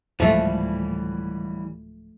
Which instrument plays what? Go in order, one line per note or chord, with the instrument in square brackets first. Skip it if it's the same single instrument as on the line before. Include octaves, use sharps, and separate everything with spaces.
[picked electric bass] D1 G#2 A#3 [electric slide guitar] E3 G3 [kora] F3 A3